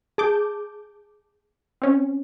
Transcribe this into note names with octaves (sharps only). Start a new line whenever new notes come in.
G#4 A5 D6 G6
C4 C#4